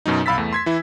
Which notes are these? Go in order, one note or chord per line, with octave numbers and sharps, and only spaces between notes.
F#2 B2 F#3 D#4
C2 F5 B5 E6 A6 B6
E2 A3
C6 G#6 B6
E3 E4